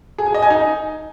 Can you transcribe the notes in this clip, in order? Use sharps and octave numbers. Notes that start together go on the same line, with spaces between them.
G#4
G#5
D#5
G#5
D#4